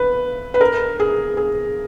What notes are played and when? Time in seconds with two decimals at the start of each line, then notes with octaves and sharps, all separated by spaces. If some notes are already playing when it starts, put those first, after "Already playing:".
Already playing: B4
0.54 B4
0.61 A#4
1.00 G#4
1.37 G#4